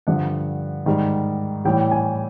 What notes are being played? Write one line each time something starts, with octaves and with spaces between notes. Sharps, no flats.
G2 D3 F3 F#5
G#2 D#3 G3
A2 E3 G3 G5
G#5